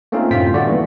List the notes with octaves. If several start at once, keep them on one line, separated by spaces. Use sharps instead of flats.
A3 A#3 C4 C#4 D#4 F4
F#2 A2 C3 F4 G5 B6
D3 G3 A3 F#4 D5
D#3 E3 A#3 B3